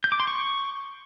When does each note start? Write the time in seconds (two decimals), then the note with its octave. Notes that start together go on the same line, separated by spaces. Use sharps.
0.04 G6
0.12 D6
0.20 C6
0.27 C#6